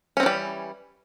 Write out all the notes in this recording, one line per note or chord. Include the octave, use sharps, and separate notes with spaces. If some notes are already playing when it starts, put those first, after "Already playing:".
E3 G3 C4 C#4